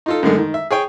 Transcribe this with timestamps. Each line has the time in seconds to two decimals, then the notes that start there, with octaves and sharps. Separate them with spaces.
0.06 D#4 F4 A4
0.23 F#2 D3 D#3 G#3 A3
0.38 D#3
0.54 E5
0.71 G#4 C#5 G5